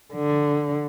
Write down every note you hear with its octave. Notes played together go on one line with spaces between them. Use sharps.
D3